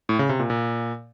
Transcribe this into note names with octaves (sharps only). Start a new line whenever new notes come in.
A2
C#3
C3
A#2
A#2